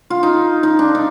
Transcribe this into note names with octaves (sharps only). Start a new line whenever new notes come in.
F4
D#4
D#4
D4
D#4